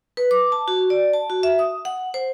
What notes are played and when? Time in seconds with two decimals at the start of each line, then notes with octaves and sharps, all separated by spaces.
0.17 B4
0.31 D6
0.52 A5
0.68 F#4
0.90 D5
1.13 A5
1.30 F#4
1.43 E5
1.59 D#6
1.85 F#5
2.14 C5